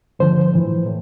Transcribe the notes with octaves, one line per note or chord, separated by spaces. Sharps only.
G2 D3 F3 C5
A2 E3
A2